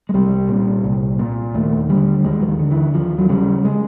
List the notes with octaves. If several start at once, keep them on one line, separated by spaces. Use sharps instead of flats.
G#3
C2 G3
A#2
C2
A#2
D#2 A3
D3 G3
D#2 G#3
E3
D#3
D3
E3
D#2 F3
F#3
C#3 G3
G#3